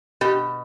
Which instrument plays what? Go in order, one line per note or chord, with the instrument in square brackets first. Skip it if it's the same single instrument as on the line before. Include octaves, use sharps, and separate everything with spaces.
[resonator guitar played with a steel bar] B2 G4